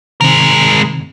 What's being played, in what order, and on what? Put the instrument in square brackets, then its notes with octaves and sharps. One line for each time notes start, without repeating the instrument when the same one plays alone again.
[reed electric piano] C3 D#3 C4 [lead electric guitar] G#3 A#4